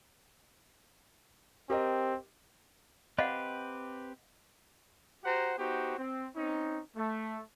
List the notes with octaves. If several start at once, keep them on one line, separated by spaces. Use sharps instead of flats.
C4 G4 A#4 D#5
C4 G4 B4 D#5 F5 F#5
F#4 G4 C5 F#5 A#5
B3 D#4 F#4 G4 C5
C4
C4 C#4 D#4
A3